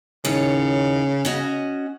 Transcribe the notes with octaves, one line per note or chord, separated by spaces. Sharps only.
D#2 A2 C#3 C#5
C#4 F#4 D#5